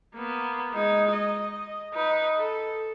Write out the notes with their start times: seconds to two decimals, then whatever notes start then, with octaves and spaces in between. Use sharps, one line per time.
0.15 A#3 B3
0.74 G#3 D#4
1.13 D#5
1.94 D#4 B4
2.37 A4